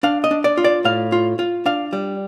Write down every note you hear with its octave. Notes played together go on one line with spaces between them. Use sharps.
D4 F5
D#5
D4
D5
F4
D5
A2 F5
F4
F4
D4 F5
G3